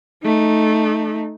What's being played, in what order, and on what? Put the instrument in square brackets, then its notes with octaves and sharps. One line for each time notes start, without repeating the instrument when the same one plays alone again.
[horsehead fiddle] A3 D#4